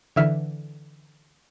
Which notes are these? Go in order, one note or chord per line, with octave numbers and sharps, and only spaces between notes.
D3 E3 E5 F6